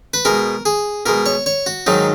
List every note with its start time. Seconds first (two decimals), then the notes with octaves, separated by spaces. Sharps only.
0.14 B4
0.25 B2 G#3 A#4
0.66 G#4
1.06 B2 G#3 A#4
1.26 C#5
1.46 C#5
1.66 F#4
1.86 G#2 D#3 F#3 D#4